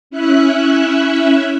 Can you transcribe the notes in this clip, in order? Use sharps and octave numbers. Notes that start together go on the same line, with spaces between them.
C#4 E4 E5 F#6